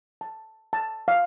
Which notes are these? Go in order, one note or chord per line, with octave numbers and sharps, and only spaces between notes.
A5
A5
F5